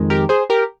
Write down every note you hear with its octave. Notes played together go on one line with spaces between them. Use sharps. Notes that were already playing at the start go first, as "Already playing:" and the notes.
Already playing: F2 D#3 G#3
G4 A#4
G#4 C5
G4 A#4